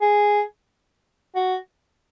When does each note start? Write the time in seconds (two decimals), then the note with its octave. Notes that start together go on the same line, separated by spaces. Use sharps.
0.02 G#4
1.36 F#4